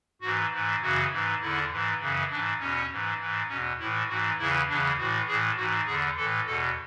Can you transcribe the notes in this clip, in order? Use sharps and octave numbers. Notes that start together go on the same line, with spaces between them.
G#2 E3 F#4
G#2 E3
F#2 C#3 E3 F#4
G#2 E3
E2 D3 E4
G#2 E3
F#2 C#3 E3
G#2 E3 D4
E2 B2 C#4
G#2 E3
G#2 E3
E2 B2 C#4
A2 E3 E4
G#2 E3 F#4
E2 C#3 E3 E4
E2 C#3 E3 D4
A2 E3 F#4
A2 E3 G#4
G#2 E3 F#4
E2 D3 G#4
A2 E3 A4
E2 B2 A4